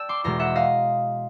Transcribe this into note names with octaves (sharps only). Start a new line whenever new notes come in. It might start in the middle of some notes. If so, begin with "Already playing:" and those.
Already playing: D5 G5 A5 E6
C6 D6
E2 B2 G#3 A#5 C6
E5 F#5
D#5 F5